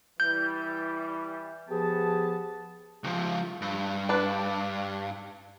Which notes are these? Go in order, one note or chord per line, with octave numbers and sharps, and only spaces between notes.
E3 G3 G6
F3 B3 G4 G#4 A5
C#2 F3
G2
D4 B4